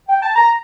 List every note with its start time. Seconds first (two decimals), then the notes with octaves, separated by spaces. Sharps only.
0.09 G5
0.22 A5
0.36 A#5